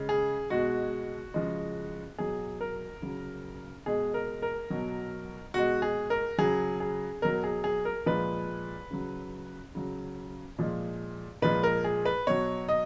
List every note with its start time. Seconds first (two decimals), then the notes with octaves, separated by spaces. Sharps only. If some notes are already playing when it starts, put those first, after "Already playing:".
Already playing: C#3 G#3
0.09 G#4
0.50 B2 G#3 F#4
1.34 C#3 F3 G#3
2.18 B2 F#3 G#4
2.61 A#4
3.02 C#3 F#3
3.86 B2 G#3 G#4
4.14 A#4
4.42 A#4
4.70 B2 F#3
5.54 B2 G#3 F#4
5.82 G#4
6.10 A#4
6.38 C#3 F#3 G#4
6.80 G#4
7.22 B2 F#3 A#4
7.44 G#4
7.64 G#4
7.85 A#4
8.06 A#2 F3 G#3 B4
8.91 C#3 F#3
9.75 C#3 F#3
10.58 A#2 F3 G#3
11.42 A#2 F3 G#3 B4
11.63 A#4
11.84 G#4
12.06 B4
12.27 B2 F#3 C#5
12.69 D#5